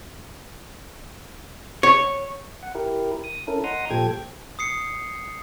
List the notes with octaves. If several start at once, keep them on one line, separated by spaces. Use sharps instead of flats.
C#5
F#5
E4 G4 A#4
D#6
C#4 E4 A4 A#4
D#5 F#5 A#5 C6 D#6
A#2 F3 G4 A4 G5 G#6
D#6 C7 C#7